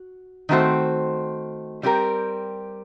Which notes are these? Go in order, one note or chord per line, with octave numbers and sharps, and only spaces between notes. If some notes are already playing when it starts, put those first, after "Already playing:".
Already playing: F#4
D#3 A3 C4 F#4 C5
G3 C4 G4 A#4